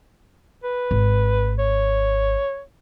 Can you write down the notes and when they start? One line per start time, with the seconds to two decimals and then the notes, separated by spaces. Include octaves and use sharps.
0.64 B4
0.91 G#1
1.59 C#5